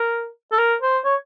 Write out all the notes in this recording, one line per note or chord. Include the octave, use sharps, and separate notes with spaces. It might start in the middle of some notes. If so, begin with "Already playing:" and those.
Already playing: A#4
A4
A#4
C5
C#5